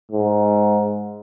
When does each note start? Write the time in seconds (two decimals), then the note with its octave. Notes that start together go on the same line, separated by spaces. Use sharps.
0.12 G#2